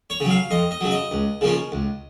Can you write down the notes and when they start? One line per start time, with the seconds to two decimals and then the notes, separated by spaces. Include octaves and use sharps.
0.10 C#5
0.20 C#3 F#3
0.30 F5
0.51 F2 D#5
0.71 D#5
0.81 C#3 F#3
0.91 D#5
1.11 C#2
1.41 C#3 F3 A#3 C#4
1.72 C#2